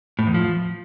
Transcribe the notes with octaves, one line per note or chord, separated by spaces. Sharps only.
A2
E2
F3